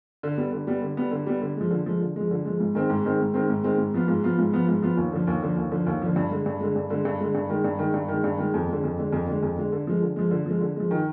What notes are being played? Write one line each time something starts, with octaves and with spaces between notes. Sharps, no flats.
D3
G3 B3
D3
G3 B3
D3
G3 B3
D3
G3 B3
D3
F3 G#3
D3
F3 G#3
D3
F3 G#3
D3
F3 G#3
G#2
D#3 G#3 C4
G#2
D#3 G#3 C4
G#2
D#3 G#3 C4
G#2
D#3 G#3 C4
G#2
F3 B3 F4
G#2
F3 B3 F4
G#2
F3 B3 F4
G#2
F3 B3 F4
D#2
D3 F3
D#2
D3 F3
D#2
D3 F3
D#2
D3 F3
G2
D3 G#3
G2
D3 G#3
G2
D3 G#3
G2
D3 G#3
G2
D#3 G#3
G2
D#3 G#3
G2
D#3
G#3
G2
D#3 G#3
F2
D3 G#3
F2
D3 G#3
F2
D3 G#3
F2
D3 G#3
D3
F3 G#3
D3
F3 G#3
D3
F3 G#3
D3
F3 G#3
D#3